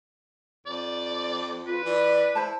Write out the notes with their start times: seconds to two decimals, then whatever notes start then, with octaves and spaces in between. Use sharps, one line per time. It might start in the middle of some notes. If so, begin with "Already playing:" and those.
0.66 F2 D5
1.67 F4 B4
1.85 E3 D5
2.35 E4 C5 A5